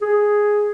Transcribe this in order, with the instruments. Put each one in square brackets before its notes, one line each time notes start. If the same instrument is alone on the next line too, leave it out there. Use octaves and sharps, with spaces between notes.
[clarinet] G#4